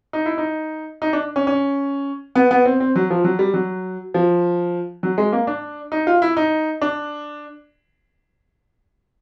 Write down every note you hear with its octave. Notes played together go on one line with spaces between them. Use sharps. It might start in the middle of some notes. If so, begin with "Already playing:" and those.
D#4
E4
D#4
D#4
D4
C#4
C#4
B3
B3
C4
C4
F#3
F3
F#3
G3
F#3
F3
F#3
G#3
A#3
D4
D#4
F4
E4
D#4
D4